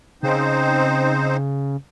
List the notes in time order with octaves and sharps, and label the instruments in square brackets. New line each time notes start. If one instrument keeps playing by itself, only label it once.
[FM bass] C#3 [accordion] C4 D#4 C5